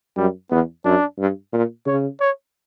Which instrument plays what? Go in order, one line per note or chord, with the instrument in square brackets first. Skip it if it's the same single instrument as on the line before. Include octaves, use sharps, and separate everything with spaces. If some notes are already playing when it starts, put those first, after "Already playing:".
[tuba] F#2 [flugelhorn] G3
[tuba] E2 [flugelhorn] B3
[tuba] F#2 [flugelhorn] D4
[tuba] G2
A#2
[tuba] C#3 [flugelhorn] C#5
[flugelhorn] C#5